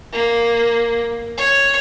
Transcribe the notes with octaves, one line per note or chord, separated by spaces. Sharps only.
A#3
C#5